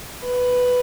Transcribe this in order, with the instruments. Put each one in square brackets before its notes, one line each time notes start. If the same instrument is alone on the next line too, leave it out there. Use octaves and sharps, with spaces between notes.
[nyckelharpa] B4